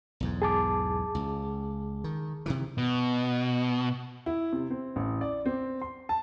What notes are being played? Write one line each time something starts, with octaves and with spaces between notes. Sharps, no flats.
B1 E2 G#2
G#4 A5 D6
C#2
D#3
C3 D#3 E3
B2
E4
C3
C4
A1
D5
C4
C6
A5